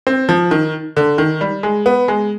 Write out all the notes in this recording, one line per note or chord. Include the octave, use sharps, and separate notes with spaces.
C4
F3
D#3
D3
D#3
G3
G#3
B3
G#3